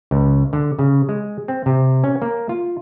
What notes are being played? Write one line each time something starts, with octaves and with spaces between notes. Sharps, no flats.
C#2
D3
C#3
G#3
C4
C3
C#4
A#3
F4